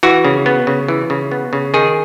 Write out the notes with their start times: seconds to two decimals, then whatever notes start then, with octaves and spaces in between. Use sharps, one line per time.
0.03 E3 F#4
0.25 C#3
0.46 B3
0.67 C#3
0.88 E3
1.10 C#3
1.31 B3
1.53 C#3
1.74 D#3 G#4